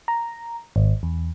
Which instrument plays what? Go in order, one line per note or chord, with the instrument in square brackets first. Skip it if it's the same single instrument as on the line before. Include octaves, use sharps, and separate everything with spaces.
[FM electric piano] A#5
G#1
E2